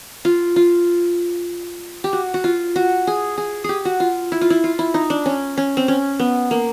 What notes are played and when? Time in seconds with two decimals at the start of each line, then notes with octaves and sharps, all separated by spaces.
0.25 F4
0.56 F4
2.04 G4
2.13 F#4
2.34 F#4
2.44 F4
2.76 F#4
3.07 G#4
3.38 G#4
3.64 G4 G#4
3.85 F#4
4.00 F4
4.32 E4
4.41 F4
4.50 E4
4.64 F4
4.79 E4
4.94 D#4
5.10 D4
5.26 C#4
5.57 C#4
5.77 C4
5.88 C#4
6.19 B3
6.51 A#3